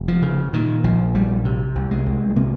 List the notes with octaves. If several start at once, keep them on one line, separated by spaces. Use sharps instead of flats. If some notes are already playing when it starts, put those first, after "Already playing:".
Already playing: F1
F3
C#3
A#2 D#3
A#1 F3
A#1 G3
C3
C2
G#3
C2
G#3
C3 A#3